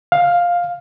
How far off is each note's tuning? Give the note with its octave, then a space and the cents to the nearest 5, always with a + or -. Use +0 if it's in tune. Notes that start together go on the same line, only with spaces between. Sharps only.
F5 +5